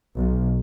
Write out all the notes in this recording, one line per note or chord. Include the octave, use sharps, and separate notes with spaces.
B1